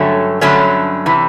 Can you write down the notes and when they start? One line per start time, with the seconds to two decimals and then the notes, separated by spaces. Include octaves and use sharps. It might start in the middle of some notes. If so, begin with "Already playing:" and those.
Already playing: G2 D3 F#3 A3 C#4
0.41 G2 D3 F#3 A3 C#4
1.06 C3 E3